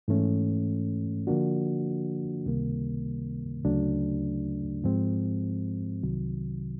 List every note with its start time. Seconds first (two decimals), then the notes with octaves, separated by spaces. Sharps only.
0.08 G#2 E3 A3 C#4
1.27 D3 F3 A#3 D4 F#4
2.46 C#2 C3 D#3 G3 A#3
3.65 D2 C#3 F#3 A3 D4
4.84 G#2 F3 G#3 C4
6.03 C2 C3 D#3 F#3